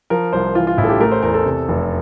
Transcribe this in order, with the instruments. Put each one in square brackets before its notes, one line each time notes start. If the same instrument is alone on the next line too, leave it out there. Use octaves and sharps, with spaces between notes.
[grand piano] F3 A#4
C2 C5
E3 F4
F4
A1 E4
A4
G4
A3 A#4
C5
E2 A#4
A4
C3
F1